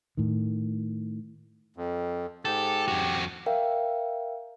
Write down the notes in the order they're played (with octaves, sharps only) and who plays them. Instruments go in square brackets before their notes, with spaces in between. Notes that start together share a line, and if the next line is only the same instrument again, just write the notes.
[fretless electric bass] A2 D#3
[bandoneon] F2
[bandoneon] G#2 [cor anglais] G4 [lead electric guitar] A4
[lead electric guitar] F2 F#4
[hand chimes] A#4 E5 F5 G5